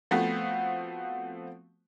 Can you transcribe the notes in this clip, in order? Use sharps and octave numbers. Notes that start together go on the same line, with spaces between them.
F3 A3 B3 C4 F#4